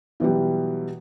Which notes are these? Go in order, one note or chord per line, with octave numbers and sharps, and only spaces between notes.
B2 E3 F#3 G3